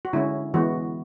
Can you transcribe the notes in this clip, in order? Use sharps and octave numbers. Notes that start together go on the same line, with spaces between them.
F#4
D3 G#3 C#4 E4
E3 G#3 B3 F#4